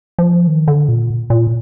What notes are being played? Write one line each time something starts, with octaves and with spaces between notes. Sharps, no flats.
F3
D#3
D3
A#2
A#2